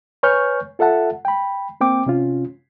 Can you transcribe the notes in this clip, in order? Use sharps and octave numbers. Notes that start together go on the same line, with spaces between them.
B4 C#5 G#5 C#6 F6 G6
F4 A4 E5 F#5 A5
G5 B5
A#3 C4 G5 D6
C3 C#4 F4